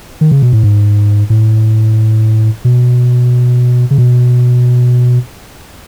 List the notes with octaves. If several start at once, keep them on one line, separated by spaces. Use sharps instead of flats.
D#3
C#3
B2
A2
G#2
A2
B2
C#3
B2